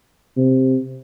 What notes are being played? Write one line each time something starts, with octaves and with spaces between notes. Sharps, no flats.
C3